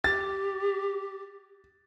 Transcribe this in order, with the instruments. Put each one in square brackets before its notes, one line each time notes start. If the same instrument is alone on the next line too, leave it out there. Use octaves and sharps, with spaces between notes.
[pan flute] G4 [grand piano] A6